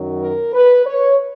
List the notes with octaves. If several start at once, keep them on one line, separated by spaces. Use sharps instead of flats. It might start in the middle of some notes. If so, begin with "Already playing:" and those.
Already playing: F#2 D#3 F#3
A#4
B4
C#5